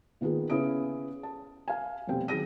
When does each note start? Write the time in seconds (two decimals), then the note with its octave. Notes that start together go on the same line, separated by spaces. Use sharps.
0.21 A#2 D#3 B3 F4 G#4
0.50 C#3 B3 C#4 E4 D#6 D7
1.23 A5
1.68 F5 G#5
2.07 F1 B2 G3 C4 G5
2.28 D#3 F#3 G#4 A#6 D#7